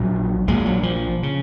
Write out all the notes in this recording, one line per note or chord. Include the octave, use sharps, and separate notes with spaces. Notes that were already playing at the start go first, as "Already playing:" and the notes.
Already playing: A#1 A#2 F#3
A#1 A#2 G#3
F#3
F3
C#3